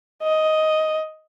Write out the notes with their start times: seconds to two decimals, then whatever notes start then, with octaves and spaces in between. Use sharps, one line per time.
0.22 D#5